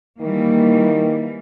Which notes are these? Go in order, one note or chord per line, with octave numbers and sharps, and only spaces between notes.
D#3 E3 G3 A#3